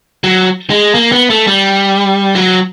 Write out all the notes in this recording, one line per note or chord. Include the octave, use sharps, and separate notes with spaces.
F#3
G#3
A#3
B3
A3
G3
F#3